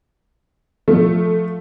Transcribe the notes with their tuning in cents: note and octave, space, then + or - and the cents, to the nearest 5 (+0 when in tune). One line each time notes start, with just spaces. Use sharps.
F3 +10 A3 +0